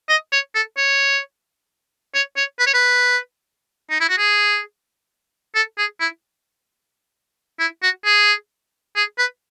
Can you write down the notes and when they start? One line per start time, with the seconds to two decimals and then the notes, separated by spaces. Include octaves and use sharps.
0.09 D#5
0.32 C#5
0.55 A4
0.77 C#5
2.15 C#5
2.37 C#5
2.60 B4
2.67 C#5
2.74 B4
3.90 D#4
4.00 E4
4.09 F#4
4.18 G#4
5.55 A4
5.78 G#4
6.00 E4
7.60 E4
7.83 F#4
8.05 G#4
8.96 G#4
9.18 B4